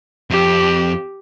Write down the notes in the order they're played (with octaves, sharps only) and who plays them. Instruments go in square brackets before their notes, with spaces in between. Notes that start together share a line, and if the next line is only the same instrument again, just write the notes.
[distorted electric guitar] F2 C4 [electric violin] G4